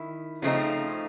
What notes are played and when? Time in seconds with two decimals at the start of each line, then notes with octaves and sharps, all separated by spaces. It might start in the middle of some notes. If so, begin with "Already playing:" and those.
Already playing: D#3 E4
0.42 C#3 F3 A3 C4 D#4